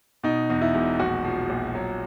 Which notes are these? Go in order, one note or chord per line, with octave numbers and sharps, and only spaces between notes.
B2 D#4
E2
E4
E1
A#1 F#4
F3
A#1
F#3